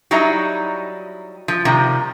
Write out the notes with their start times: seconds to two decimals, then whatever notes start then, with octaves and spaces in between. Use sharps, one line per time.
0.11 F#3 G3 D#4 E4 A#5
1.48 F3
1.65 C3 D#3 F3 G3